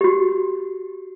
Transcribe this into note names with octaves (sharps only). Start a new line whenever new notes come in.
F#4 G4